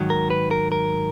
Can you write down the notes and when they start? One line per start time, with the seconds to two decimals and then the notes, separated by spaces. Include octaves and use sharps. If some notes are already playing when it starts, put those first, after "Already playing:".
Already playing: G#2 D#3 F#3
0.10 A#4
0.30 B4
0.51 A#4
0.72 A#4